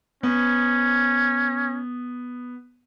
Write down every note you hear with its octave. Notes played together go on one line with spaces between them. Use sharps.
B3 C#4